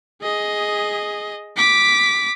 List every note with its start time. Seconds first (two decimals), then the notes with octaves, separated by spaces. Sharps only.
0.21 G#4 D#5
1.57 D6 B6